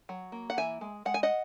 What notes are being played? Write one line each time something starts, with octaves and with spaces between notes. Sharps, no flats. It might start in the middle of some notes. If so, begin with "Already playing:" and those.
F#3
A#3
F#5
E3 E5 G#5
G#3
G#3 F#5
G#5
D#5 F#5